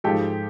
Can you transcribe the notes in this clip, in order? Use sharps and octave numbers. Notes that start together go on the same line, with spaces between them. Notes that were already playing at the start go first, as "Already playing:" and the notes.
G#2 F3 G#3 G4 A4